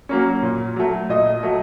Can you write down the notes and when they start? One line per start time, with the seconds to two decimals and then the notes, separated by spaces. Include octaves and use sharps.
0.09 F#3 A#3 C#4
0.43 A#2
0.76 F#3 A3
1.09 A#2 D#5
1.43 F#3 A3